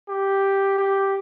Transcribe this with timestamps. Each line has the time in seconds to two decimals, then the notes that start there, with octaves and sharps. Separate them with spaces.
0.09 G4
0.78 G4